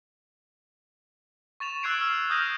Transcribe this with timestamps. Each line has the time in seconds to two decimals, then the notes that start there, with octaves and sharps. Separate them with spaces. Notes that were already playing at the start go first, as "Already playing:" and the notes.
1.60 C#6 A6 E7 F7
1.83 C#6 E6 F#6 G#6 C7 D7
2.01 E6 F6
2.30 D#6 F6 G6 A#6 D#7